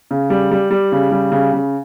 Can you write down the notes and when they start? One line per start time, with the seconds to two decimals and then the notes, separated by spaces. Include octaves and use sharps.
0.11 C#3
0.30 G3
0.51 G3
0.71 G3
0.92 C#3
1.11 G3
1.32 C#3
1.53 C#3